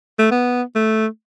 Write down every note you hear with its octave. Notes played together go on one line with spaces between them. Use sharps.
A3
B3
A3